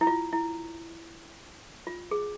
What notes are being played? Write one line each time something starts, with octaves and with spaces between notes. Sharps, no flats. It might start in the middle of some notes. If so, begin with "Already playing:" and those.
E4
F4
E4
F4
G#4